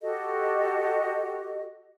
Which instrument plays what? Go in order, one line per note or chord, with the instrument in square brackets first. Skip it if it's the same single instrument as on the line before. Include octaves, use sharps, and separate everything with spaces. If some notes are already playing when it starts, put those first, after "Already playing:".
[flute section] F#4 G4 A4 D#5